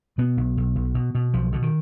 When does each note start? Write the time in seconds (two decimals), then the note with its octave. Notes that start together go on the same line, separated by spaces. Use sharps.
0.18 B2 B3
0.37 B1
0.57 B1
0.76 B1
0.95 B2
1.15 B2
1.33 B1 F3
1.52 B2 D3
1.62 D#3